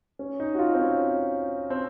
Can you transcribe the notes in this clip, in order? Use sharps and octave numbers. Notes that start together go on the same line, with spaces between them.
C#4
D#4
F#4
F4
C4
C#4
C4